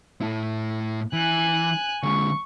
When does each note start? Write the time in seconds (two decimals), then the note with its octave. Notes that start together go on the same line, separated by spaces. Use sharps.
0.21 A2 E4
1.13 E3 G#5 F#6
2.03 D3 G#3 C#6